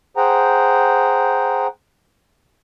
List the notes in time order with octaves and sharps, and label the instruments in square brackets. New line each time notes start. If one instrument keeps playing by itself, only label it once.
[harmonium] G#4 C5 F#5 G5 A#5